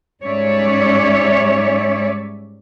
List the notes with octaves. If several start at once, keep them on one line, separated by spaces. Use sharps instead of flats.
G#2 G3 C#4 C#5 D5 E5